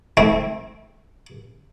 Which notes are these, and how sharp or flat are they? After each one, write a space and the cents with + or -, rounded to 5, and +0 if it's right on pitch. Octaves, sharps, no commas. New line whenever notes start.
A3 -30 C4 +0 E4 -45